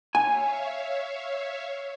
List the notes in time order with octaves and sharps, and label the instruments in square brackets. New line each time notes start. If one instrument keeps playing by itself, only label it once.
[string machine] C#5 E5 F5 [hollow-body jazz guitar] G#5